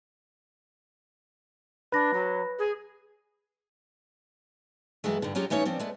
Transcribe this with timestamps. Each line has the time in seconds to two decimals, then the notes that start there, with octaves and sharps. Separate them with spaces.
1.92 D4 B4 B5 A#6
2.13 F#3
2.58 G#4
5.04 G2 E3 F#3 G#3 A3
5.22 G2 D3
5.35 F#3 G#3 C#4 F4 G4
5.50 E3 A3 C#4 D#4 C#5
5.65 F3 C4 D4
5.79 G#3 A3 B3